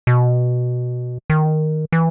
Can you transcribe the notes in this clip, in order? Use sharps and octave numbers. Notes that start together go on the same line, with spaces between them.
B2
D#3
E3